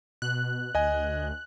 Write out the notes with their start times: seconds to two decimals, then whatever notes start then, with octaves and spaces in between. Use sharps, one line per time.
0.22 B2 F#6
0.75 D2 D#5 G#5